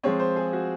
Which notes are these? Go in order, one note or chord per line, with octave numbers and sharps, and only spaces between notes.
F3 G#3 C4 C#5
C5
G#4
F#4